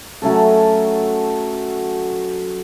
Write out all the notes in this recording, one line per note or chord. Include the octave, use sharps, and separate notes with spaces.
F#3 A3 C#4 A4